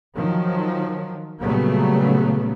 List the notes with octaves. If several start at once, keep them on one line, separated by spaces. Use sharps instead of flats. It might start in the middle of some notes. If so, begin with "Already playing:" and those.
D#3 F3 F#3
A#2 C#3 F#3 G3 A3 B3